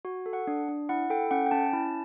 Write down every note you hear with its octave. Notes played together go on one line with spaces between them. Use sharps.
F#4
A4
F#5
D4
D4
E4 F#5
A4 G5
C#4 F#5
G5
C#4 A5
E4